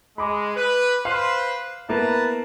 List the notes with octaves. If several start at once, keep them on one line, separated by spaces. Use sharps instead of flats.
G#3 B5 D6
B4
B4 C5 F5
A#3 B3 E4 B4 A5 A#5